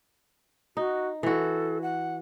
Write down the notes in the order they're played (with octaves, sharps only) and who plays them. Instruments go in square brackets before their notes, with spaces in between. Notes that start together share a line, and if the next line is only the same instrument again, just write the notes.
[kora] D#4 [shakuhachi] F#4
[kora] E3 F#4 [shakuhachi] A4
[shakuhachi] F#5